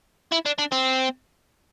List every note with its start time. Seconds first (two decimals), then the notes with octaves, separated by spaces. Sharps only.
0.32 E4
0.46 D4
0.58 D4
0.72 C4